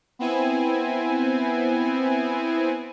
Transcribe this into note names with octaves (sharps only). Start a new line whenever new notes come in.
B3 C4 E4 G#5